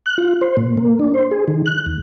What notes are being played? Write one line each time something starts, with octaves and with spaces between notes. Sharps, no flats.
F#6
F4
C5
A#2
A#3
D4
C5
G#4
D#3
F#6
D#2